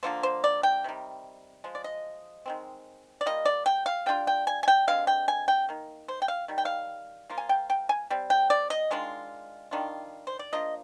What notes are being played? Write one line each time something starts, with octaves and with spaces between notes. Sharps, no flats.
D3 F3 A#3 F4 C5
C5
D5
G5
C3 D#3 G3
F3 G#3
D5
D#5
D#3 G#3 C4
D5
G3 A#3 F4 D#5
D5
G5
F5
G3 D4 F4 G5
G5
G#5
G#5
G5
D3 G#3 C4 F5
G5
G#5
G5
D#3 A#3
C5
G5
F5
D#3 G3
G5
F5
F3 A#3 F4
G#5
G5
G5
G#5
G3 C4
G5
D5
D#5
D#3 G#3 D4 F4
D#3 G3 D4 F4
C5
D5
F3 A#3 D4 F4 D#5